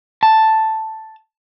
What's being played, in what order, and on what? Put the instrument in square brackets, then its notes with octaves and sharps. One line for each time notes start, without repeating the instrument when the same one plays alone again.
[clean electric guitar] A5